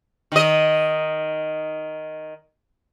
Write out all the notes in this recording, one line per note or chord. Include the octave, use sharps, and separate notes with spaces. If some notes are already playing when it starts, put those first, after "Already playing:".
D#3 D#5